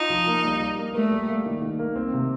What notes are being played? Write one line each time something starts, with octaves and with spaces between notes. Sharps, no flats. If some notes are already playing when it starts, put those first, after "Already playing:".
Already playing: D#4 F4
F3
A#3
G3
G3
A#3
A3 A#4
G3
A#3
D#3
D#3
A#3
C4
C3